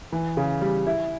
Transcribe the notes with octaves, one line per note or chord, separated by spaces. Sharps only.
E3
C#3
G3
E4